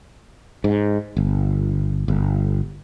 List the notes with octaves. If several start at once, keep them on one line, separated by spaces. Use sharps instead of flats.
G#2
G1
G1